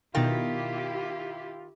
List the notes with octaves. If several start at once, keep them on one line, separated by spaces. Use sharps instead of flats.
B2 D#3 E4 F4 G4 G5 A6